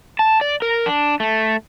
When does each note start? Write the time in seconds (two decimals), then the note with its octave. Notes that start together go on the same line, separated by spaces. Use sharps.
0.19 A5
0.41 D5
0.62 A#4
0.86 D4
1.20 A3